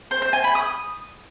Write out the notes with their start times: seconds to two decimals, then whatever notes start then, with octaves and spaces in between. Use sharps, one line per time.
0.11 C5
0.22 C5
0.33 G#5
0.44 B5
0.55 D#6